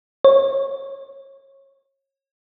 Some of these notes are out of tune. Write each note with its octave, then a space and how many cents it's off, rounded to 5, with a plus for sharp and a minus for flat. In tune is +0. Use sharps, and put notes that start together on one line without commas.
C#5 -30